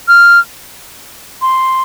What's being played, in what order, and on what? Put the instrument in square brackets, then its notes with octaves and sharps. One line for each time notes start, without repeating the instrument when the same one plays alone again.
[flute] F6
C6